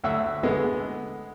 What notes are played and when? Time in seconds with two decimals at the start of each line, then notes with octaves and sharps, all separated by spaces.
0.04 D2 E5 F#5 E6
0.43 D3 G#3 B3